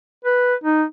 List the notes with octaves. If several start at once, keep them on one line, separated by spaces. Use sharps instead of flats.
B4
D#4